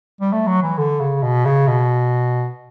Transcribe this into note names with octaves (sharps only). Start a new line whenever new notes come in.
G3
A3
F#3
E3
D3
C#3
B2
C#3
B2